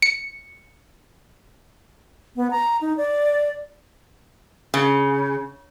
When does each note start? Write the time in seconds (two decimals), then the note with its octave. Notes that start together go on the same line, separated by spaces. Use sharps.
0.02 C#7
2.36 B3
2.51 A#5
2.81 D#4
2.97 D5
4.74 C#3